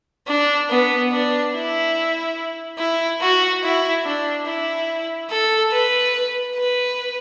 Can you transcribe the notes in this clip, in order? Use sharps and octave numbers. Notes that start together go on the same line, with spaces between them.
D4
B3
D4
E4
E4
F#4
E4
D4
E4
A4
B4
B4